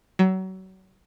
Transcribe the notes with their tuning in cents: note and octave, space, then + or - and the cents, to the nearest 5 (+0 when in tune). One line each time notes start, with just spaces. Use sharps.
F#3 +30